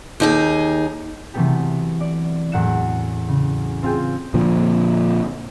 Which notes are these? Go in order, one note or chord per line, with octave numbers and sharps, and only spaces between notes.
D#2 D#4 G#4
C3 E3 F#3 A3 B3 G4
D5
E2 A2 F#3 F#5 C#7 E7
C#3
C4 F4 G#4 G5
A#2 D3 F3